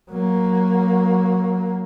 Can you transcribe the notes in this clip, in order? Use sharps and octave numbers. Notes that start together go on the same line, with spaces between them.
F#3 A#3